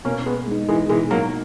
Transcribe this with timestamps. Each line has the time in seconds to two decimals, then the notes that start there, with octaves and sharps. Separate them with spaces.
0.04 B2 A#3 C#4
0.26 G#3 B3
0.47 G#3 D#4
0.68 E3 G#3
0.89 B2 E3 G#3
1.11 F#3 A#3